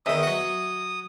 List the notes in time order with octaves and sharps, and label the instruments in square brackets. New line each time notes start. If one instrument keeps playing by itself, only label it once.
[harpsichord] E2 D#3 [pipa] D#5 E5 [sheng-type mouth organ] D#6
[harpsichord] F#3 F#4